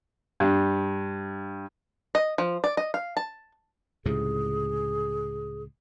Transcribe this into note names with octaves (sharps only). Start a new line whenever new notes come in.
G2
D#5
F3
D5
D#5
F5
A5
C#2 A2 C3 G#4